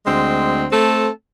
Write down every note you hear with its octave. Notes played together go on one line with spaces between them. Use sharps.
D2 G#3 C4
A3 C4 A4